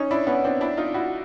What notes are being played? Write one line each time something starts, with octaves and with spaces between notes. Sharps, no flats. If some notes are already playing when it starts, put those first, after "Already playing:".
Already playing: C#4 D#4
D4 E4
B3 C#4
C4 D4
D4 E4
D#4 F4
E4 F#4